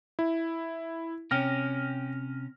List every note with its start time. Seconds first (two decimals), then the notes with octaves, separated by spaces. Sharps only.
0.19 E4
1.31 C3 C#4 G5 F6 A#6